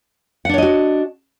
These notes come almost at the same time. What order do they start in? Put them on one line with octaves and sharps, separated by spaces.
F#5 D4 C#5 D#5 F#4